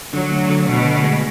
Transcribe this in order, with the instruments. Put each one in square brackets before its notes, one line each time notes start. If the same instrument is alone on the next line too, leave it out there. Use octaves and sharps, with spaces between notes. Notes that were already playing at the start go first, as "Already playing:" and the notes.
[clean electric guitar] D3 [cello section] F#3
[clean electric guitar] D2
D3
[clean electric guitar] D2 [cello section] B2
[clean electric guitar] D2
G#3